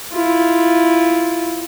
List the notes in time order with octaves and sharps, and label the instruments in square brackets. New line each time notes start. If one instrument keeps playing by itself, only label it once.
[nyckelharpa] E4 F4